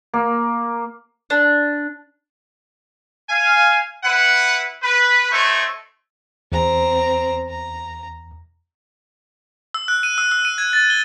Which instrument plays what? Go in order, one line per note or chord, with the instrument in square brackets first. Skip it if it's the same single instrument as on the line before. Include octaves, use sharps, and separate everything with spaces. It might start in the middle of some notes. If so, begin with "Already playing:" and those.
[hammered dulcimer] A#3
[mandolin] D4
[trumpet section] F5 G#5
E4 B4 F#5
B4
A3 C4 D#4 C#5 C#6
[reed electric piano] E2 [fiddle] C4 A#5
[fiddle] A#5
[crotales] E6
F#6
D#7
E6
E6
D#7
G#6
A6
G7